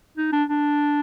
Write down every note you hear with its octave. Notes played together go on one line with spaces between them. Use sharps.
D#4
D4
D4